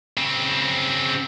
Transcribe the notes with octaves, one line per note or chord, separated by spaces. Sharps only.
C#3 C4